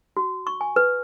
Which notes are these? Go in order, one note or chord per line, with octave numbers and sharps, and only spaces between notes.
F#4
C#6
G#5
B4